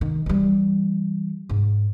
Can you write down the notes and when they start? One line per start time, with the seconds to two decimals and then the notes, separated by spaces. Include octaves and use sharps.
0.01 D#3
0.26 E3 G3
1.49 G#2